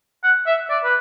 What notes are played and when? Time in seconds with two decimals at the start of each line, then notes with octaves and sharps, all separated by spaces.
0.23 F#5
0.46 E5
0.70 D5
0.84 B4